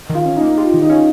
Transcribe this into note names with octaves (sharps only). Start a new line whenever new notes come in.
D#3
F4
C#4
D#4
A#3
F4 G4
D#3
D#4
C#4 F4